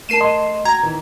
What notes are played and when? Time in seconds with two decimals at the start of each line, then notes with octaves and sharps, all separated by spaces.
0.09 A3 A#4 A5 C7 D#7 E7
0.21 D#5 C6
0.65 F#4 G5 A#5 G#6
0.83 E2 D#3 E3